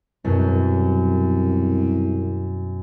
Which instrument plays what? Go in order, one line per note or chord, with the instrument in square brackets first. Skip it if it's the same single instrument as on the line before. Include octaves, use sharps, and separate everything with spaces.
[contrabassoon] C2 [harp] F#2 B2